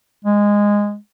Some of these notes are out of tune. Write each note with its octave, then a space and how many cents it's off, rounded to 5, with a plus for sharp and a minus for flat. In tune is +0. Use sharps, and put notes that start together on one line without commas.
G#3 -15